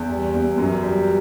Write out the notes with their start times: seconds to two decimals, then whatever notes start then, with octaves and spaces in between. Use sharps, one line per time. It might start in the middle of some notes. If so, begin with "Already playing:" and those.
Already playing: E2
0.09 G3
0.34 E2
0.58 F#2
0.83 G3